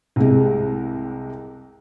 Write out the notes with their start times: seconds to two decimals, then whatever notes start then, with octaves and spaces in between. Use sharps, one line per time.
0.16 C2 C3 G#3